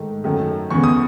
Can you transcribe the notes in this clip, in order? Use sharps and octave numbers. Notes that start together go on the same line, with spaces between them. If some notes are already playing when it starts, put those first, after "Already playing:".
Already playing: G#2 D#3 A3
F#2 D#3 F#3 A3
E2 C#3 E3 C#6
D#6